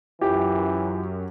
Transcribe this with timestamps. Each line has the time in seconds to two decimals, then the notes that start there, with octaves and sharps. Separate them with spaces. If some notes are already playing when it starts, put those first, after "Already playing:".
0.21 F#2 E3 E4 F4 G4 G5